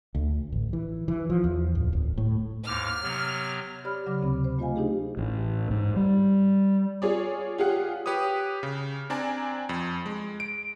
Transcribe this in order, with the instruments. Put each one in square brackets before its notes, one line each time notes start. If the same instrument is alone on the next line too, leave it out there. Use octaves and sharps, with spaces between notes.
[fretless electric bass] D2
A1
E3
E3
F3
E2
D1
D1
A2
[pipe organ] D#2 G#2 D6 [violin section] F6
[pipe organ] C3 F#3 B3
[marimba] G4 C#5 D5 B5 F6
C#3 F#3 D5 D6
D2 C3 C4 B5
C5
A3 F4 C5 D#5 F5 G#5
D4 D#4 G4 G#4
[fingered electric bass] A1
G#2
G3
[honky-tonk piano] F4 G#4 C#5 D5
F4 G4 G#4 F5 F#5
[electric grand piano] G4 B4 C#5 D#6
C#3
C4 D4 D5 G#5 A#5
F2
G#3
D7